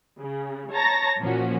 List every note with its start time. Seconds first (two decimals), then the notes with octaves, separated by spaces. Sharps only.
0.21 C#3
0.73 C#5 A5 A#5 A6 A#6
1.21 A#2 F3 C#4 F#4